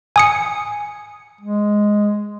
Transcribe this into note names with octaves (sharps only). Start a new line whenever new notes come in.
G#5 D#6 C#7
G#3